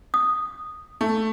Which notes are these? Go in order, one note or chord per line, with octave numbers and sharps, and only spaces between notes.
D#6
A3